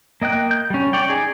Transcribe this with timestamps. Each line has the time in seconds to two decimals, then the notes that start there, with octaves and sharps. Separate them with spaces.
0.22 A#3 D#5 G5 F#6
0.51 G6
0.70 G3 C#4
0.93 C#5 D5 G5
1.09 D#4 G#4 D5